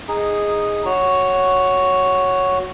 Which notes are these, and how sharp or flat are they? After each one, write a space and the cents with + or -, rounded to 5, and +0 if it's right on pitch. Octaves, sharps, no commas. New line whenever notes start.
D#4 +0 G#4 -10
F#4 +0 C#5 +0